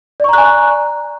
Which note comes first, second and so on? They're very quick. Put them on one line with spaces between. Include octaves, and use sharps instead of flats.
D5 C#6 A#5 F#6 G#5